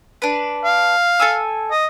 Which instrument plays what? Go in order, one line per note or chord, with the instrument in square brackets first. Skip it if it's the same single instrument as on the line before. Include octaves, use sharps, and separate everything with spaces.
[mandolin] D4 B4
[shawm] F5
[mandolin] A4 G#5 E6
[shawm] D#5